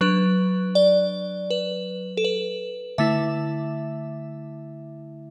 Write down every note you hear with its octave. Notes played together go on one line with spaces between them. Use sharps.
F#3 D4 B4
D5
B4
A4
B4
D3 A3 E4 E5